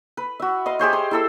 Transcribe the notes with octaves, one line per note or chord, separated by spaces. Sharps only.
B4
F#4 E5
D#5 F5 C6
G4 G#4 C5 C#5
C6
E4 A4 E6